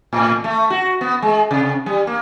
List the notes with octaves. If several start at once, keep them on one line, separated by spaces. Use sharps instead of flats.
A2
A3
F#4
B3
G#3
C3
G3
A#3